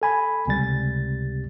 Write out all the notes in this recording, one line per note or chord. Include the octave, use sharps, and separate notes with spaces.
A4 G#5 B5
C#2 C3 G3 A6